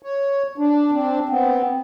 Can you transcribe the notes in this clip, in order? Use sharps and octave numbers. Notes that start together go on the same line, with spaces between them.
C#5
D4
C4 D4
B3 C4